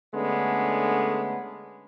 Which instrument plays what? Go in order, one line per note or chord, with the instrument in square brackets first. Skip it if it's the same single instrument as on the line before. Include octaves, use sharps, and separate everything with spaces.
[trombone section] D3 G#3 A3 B3 C#4 D4